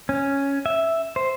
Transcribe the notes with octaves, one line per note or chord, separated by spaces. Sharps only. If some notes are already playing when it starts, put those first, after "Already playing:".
C#4
E5
C5